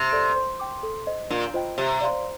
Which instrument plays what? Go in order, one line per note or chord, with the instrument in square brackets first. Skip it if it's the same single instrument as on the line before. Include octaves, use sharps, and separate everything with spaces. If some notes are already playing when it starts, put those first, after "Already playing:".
Already playing: [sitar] C3
[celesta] A4 D5
C5
G5 D6
A4
C5 D#5
[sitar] A#2 [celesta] D4
[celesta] F4 C5 D#5 G5
[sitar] C3 [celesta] G4
[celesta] D5 F5 C6